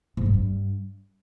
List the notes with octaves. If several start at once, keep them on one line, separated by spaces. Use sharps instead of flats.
G#2
A#3
G2